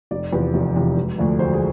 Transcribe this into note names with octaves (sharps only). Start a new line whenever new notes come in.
F1 D5
E2 C3 F3 B4
F1
E2 C3 F3
E1
D2 D3 F3 A3
E1 C5
G#4